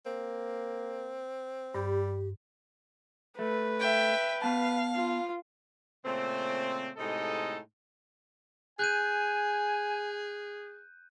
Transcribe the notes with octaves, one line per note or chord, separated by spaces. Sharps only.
A#3 C4
G2 G3 G4 G6
A3 B4
E5 G5
B3 F5 A5
F4
A#2 C#3 A3 C4
A2 C3 G#3 D#4 A4 D#5
G#4 G#5 F#6 G6 D#7